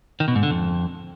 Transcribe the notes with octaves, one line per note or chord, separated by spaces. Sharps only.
D#3
B2
G#2
D3
F2